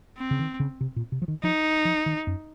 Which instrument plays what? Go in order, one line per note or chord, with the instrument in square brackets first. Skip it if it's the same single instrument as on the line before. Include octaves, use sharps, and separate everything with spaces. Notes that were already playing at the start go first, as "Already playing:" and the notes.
[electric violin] C4
[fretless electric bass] C#3
D#3
C#3
C3
A#2
C3
F3
D#3
[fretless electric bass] F3 [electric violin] D#4
[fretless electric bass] F3
D#3
F#2